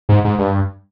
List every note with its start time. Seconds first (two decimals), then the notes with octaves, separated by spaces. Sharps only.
0.09 G#2
0.24 G#2
0.39 G2